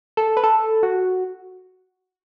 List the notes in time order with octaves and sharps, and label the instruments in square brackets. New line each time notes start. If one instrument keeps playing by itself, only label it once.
[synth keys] A4
B4
A4
F#4